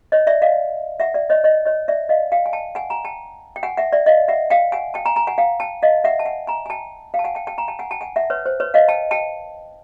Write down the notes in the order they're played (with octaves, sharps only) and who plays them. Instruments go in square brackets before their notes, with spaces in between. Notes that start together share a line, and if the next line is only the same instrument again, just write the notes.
[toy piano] C#5 D#5
D5 E5
D#5 F5
E5 F#5
D5 E5
C#5 D#5
C#5 D#5
C#5 D#5
D5 E5
D#5 F5
F5 G5
G#5
G5 A5
F#5 G#5
G#5 A#5
G5 A5
G5
F#5 G#5
E5 F#5
D5 E5
D#5 F5
E5 F#5
F5 G5
F#5 G#5
G5 A5
G#5 A#5
G#5 A#5
F#5 G#5
F5 G5
G5 A5
D#5 F5
E5 F#5
A5
F#5 G#5
G#5 A#5
G#5
G5 A5
F5 G5
A5
F#5 G#5
G5 A5
G5 A5
G#5 A#5
G5 A5
F#5 G#5
G5 A5
F#5 G#5
E5 F#5
B4 C#5
C5
B4 C#5
D#5 F5
G5 A5
G5 A5